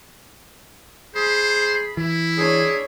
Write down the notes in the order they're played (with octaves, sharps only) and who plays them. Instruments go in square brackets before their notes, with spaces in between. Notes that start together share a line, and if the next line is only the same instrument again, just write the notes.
[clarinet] G#4 [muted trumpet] C5 [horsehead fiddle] B5
[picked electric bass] E3 [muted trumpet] E4
[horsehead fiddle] D4 C#5 [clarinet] G#4